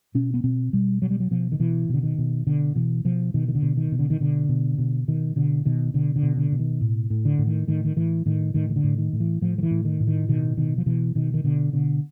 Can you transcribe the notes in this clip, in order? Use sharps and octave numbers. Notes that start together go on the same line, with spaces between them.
B2 C#4
B3
B2 C4
B2 G3
B2 F#3
G3
F#3
B2 F3
D#3
B2 E3
B2 D3
D#3
B2
B2 D3
B2 E3
B2 F3
B2 D#3
D#3
D3
B2
D#3
B2
D3
D#3
B2 D3
B2
B2
B2 D#3
B2 D3
B2 D#3
B2 D3
D3
B2
D3
B2
D#3
A2
A2
D3
A2
D#3
A2 D#3
D#3
A2 E3
A2 D#3
A2 D#3
D#3
D3
A2
D#3
A2
E3
A2 F3
F3
E3
A2
D#3
A2
D#3
B2 D#3
B2 D#3
F3
B2 E3
B2 D#3
D#3
B2 D3
B2 D3